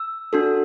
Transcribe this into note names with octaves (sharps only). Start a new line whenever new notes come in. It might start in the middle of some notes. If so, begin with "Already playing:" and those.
Already playing: E6
D4 F#4 A4